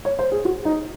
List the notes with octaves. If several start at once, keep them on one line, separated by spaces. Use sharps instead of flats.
C#5
C5
G#4
F#4
D#4